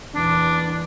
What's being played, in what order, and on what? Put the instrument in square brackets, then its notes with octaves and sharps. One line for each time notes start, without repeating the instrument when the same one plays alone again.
[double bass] E2 A#2 [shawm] D4